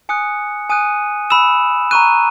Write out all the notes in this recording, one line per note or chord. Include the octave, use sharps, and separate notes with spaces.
G#5 D#6 F#6 C#7
G#5 D#6 F#6 D#7
B5 E6 E7
A#5 C#6 F#6 D#7